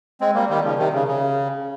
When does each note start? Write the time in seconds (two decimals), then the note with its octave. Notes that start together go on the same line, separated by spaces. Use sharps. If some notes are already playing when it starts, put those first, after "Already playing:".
0.21 G#3 C4
0.35 G3 A#3
0.50 D#3 G3
0.64 C#3 F3
0.78 C3 D#3
0.93 C#3
1.07 C#3